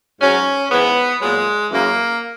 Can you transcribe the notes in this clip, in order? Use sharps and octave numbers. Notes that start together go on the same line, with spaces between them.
G#2 F#3 C#4
G#2 E3 B3
A#2 F#3 G#3
F#2 C#3 E3 A#3